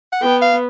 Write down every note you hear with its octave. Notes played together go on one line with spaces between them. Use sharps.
F#5
B3 G5
F5